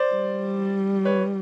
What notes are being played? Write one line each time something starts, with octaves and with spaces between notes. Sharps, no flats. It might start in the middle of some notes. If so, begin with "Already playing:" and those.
Already playing: C5 D5
G3
B4 C#5